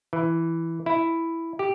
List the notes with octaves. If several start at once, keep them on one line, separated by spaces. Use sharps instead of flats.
E3
E4
G4